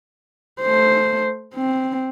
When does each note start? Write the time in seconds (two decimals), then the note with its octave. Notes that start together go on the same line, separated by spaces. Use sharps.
0.61 A3 C5
1.54 C4